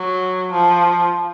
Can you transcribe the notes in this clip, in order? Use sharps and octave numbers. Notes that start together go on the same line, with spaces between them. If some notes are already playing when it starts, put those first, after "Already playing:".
Already playing: F#3
F3